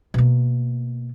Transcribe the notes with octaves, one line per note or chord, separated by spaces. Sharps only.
B2 A#3